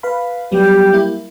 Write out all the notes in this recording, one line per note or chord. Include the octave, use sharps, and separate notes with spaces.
B4 F5 B5
F#3 G3 B3 G4
A#3 E4